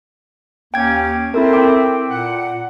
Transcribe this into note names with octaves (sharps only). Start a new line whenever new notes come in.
D#2 A#3 C#4 G5 G#6
C4 E4 A4 A#4 E5
G5 D6
A#2 F#5